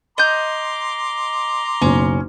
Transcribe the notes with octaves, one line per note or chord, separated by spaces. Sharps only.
D#5 A#5 C6 D6 G6
F#1 B1 C#4